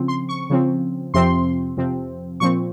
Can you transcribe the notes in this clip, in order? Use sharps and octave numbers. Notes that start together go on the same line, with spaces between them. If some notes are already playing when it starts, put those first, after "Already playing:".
Already playing: C#3 F3 C4
C6
C#6
C#3 F3 C4
F2 C3 F3 C4 C6
F2 C3 F3 C4
A#2 F3 C4 C#6